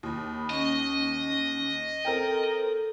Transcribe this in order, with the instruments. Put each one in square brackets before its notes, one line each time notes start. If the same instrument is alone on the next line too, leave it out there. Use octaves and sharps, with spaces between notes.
[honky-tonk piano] D#2 [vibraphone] B5 D#6
[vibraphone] C#4 C#6 [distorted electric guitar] D#5
[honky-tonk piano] C4 A#4 G5 [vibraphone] A4